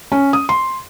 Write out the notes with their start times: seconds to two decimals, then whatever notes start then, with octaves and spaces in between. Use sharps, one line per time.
0.12 C#4
0.33 D#6
0.49 C6